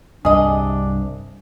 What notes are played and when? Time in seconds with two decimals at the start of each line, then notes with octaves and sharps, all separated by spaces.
0.25 C2 G2 D4 G#4 D#5